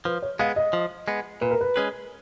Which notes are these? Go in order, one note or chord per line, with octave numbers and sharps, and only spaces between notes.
F3 B4
C#5
G#3 B3 F5
D#5
F3
G#3 B3
A#2 B4
A#4
B4
G#3 C#4 G#4 B4